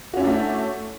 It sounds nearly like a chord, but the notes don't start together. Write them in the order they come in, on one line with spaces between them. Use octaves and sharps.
F#4 C#4 E4 D4 A3